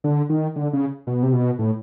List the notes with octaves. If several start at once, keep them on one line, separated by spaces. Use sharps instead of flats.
D3
D#3
D3
C#3
B2
C3
B2
A2